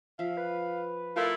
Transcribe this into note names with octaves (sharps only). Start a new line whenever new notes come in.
F3 E5 F5
B4
A3 E4 F4 A#4